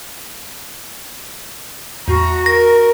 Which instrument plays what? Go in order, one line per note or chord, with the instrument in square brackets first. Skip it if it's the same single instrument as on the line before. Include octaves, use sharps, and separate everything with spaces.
[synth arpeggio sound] E2 A2 [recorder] F#4 [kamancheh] A#5
[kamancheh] A#4 [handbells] A#6